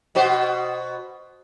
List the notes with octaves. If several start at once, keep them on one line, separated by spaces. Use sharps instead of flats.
B2 F#4 C5